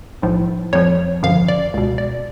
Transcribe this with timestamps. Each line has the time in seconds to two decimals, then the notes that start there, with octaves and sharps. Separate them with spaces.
0.22 B1 A2 F3
0.73 F2 F3 C#5
1.23 G#1 F#2 D3 F3 F5
1.48 D5
1.74 C#2 B2
1.98 D5